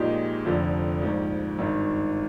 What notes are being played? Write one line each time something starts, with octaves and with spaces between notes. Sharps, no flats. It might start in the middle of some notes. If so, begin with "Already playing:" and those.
Already playing: A#1 A#2 G#3 D#4 G4
F1 F2 D3 F3
A#1 G#2 F3
G#1 G2 D#3